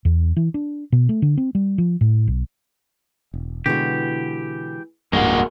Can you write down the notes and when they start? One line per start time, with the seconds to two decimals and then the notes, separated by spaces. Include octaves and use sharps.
0.05 E2
0.37 E3
0.54 D4
0.92 B2
1.09 A3
1.22 D3
1.37 C4
1.55 G3
1.78 F3
2.01 A2
2.28 B1
3.34 E1
3.66 B2 D3 E3 G#3 F#4 G4
5.13 D1 G2 G#3 A#3 F#4 G#4